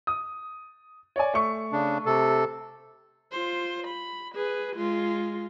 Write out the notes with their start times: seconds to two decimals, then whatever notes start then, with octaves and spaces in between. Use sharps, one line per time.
0.07 D#6
1.16 C#5 D5 G#5
1.34 A3 C#6
1.72 C#3 D4
2.06 C3 A4
3.32 F4 C5
3.87 B5
4.35 G#4 B4
4.76 G#3 F4